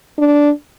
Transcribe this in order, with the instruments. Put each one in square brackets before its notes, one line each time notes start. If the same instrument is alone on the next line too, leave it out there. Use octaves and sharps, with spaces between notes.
[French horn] D4